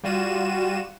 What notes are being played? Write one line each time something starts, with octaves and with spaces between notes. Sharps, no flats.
G3 F4 F#4 D#7 E7